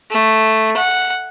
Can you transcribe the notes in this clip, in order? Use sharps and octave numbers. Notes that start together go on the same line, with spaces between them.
A3
F#5